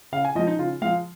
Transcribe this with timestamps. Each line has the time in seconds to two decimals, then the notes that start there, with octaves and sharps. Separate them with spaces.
0.12 C#3 F5
0.25 G#5
0.35 F3 G#3 D#5
0.47 D#4
0.58 C#3 F4
0.82 F3 G#3 F5